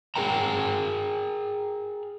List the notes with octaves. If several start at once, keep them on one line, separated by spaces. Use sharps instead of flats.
G#4 A#4 G5 A#5